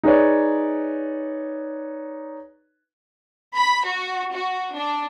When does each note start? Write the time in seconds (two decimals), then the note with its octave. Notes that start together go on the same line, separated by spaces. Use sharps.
0.03 D#4 G#4 B4 C#5 D5
3.56 B5
3.86 F#4
4.34 F#4
4.76 D4